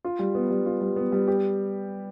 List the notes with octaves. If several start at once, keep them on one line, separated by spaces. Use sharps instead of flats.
F4
G3
B3
G3
F4
G3
B3
G3
G4